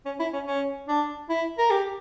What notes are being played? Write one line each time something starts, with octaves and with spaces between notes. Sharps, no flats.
C#4
E4
C#4
C#4
D4
E4
A#4
G4